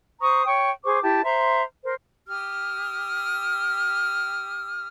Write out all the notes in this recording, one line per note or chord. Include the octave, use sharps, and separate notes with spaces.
C5 A#5 C#6 D#6
C#5 G5 C#6
G#4 C5 C#6 D6
E4 G4 A5
C5 E5 A#5 C6
A#4 C5
G4 D#6 F6